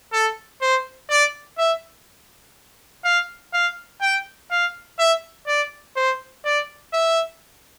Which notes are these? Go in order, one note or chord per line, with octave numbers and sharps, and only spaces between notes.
A4
C5
D5
E5
F5
F5
G5
F5
E5
D5
C5
D5
E5